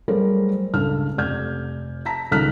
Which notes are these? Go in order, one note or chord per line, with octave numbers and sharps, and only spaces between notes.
F#3 G3 A3 G#4 A#4 C5
C#2 G2 A4 F6
F1 D5 F6 G6 G#6
A5 A#5 A#6 B6
C#2 D#3 A#5 F6 F#6 B6